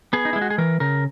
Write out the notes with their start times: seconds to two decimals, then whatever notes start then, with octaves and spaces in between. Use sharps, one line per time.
0.13 B3 G#4
0.25 D#4
0.33 G#3 E4
0.41 F#4
0.50 G#4
0.58 E3 A#4
0.80 C#3 A#4